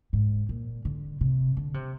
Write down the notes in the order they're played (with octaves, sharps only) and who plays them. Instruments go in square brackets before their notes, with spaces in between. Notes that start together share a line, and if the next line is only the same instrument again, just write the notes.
[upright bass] G#2
A#2
D3
C3
D3
C3